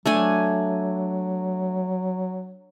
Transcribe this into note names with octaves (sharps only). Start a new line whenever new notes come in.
F#3 A3 D4 G#5